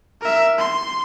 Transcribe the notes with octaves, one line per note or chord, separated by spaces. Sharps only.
A#4 E5
C6